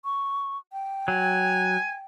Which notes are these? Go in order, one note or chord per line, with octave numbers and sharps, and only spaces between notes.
C#6
G5
F#3 G#5